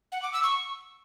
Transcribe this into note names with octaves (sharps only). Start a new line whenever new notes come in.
F#5
D6
E6
C#6